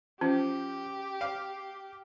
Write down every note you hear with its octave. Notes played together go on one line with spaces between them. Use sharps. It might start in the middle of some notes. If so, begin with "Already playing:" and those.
F3 C#4 G4
F5